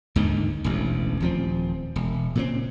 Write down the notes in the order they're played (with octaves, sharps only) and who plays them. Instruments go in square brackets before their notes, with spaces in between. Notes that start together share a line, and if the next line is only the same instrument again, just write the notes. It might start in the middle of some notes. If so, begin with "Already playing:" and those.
[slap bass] D#2 G#2 D3 D#3
E1 A1 D2
D#1 F3 C4
E1
A#2 C#3 C4